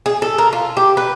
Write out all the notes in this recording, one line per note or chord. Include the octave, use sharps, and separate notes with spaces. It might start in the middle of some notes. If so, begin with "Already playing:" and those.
G#4
A4
A#4
F4
G4
B4